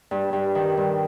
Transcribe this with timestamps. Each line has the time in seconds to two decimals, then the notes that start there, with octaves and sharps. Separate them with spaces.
0.11 G2
0.33 G2
0.55 D#3
0.77 G2